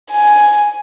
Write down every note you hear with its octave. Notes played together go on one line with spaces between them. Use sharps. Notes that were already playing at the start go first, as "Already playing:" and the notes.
G#5